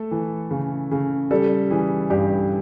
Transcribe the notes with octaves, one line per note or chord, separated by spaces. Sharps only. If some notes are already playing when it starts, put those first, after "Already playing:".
Already playing: A3 A4
E3
C#3
C#3
G3 A4
E3 G#4
G2 G4